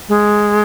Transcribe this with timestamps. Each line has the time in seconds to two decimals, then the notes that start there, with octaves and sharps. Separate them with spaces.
0.09 G#3